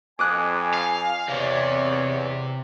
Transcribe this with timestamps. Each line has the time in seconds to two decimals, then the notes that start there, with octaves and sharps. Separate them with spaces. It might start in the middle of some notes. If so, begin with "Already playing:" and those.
0.19 F2 G#5 D6 D#6 F#6
0.73 F5
1.28 E2 C3 C#5 D5